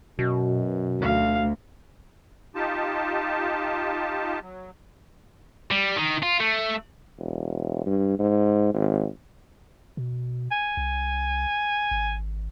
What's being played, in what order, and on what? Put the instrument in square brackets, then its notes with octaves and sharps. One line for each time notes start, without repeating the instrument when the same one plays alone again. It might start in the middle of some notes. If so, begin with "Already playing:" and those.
[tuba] F#2 [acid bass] B2
[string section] D2 [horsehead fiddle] F5
[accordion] D#4 F4 G4 A5
F#3
[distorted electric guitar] G3
D#3
F4
A3
[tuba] E1
G2
G#2
G#1
[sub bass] B2
[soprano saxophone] G#5
[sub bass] C2
G#1